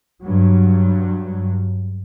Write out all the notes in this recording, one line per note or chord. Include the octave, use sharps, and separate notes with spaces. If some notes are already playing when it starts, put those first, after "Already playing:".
G2 F#3